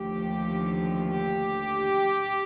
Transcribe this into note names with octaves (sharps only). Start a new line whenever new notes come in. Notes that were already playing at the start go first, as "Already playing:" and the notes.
Already playing: D#2 D3 F3 A3 G4
G4